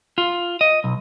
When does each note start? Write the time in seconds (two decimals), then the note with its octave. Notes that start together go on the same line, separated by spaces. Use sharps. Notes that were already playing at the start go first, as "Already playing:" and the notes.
0.18 F4
0.61 D#5
0.84 B1